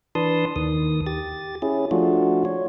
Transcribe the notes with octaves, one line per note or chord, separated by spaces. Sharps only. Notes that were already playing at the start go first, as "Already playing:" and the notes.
E3 D4 B4 A5 C6 D#6
D#2 D#3 D#6
G4 A6
C#4 E4 G#4
F3 A3 D4 F4 F#4
F4 C#5